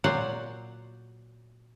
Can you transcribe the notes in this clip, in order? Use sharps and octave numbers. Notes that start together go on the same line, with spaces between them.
A#2 F#3 C5 D5 F#5